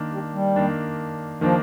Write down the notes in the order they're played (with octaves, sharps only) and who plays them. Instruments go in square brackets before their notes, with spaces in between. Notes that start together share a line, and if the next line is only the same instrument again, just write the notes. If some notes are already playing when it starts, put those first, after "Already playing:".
Already playing: [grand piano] D#3 A#3 D4
[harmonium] G3
G3
[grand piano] D#3 A#3 D4
[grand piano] D#3 A#3 D4 [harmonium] F3